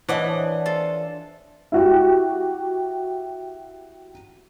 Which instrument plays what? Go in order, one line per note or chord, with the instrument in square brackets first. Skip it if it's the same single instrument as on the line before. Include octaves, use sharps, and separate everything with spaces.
[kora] E3 [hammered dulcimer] D4 [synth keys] C5 C#5 A5 [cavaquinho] D#5 F#5 D6
[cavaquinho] F4 A4
[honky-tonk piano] E4 F#4 G4